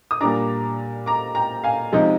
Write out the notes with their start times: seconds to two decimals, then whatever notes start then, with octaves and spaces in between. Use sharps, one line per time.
0.11 D#6
0.20 A#2 G3 D4 A#5 D6
1.06 A#5 D6
1.35 G5 A#5
1.64 F5 G#5
1.92 C3 F3 G#3 D#4 D#5